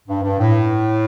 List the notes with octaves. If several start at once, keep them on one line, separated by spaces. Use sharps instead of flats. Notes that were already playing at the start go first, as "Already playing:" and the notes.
G2
G2
A2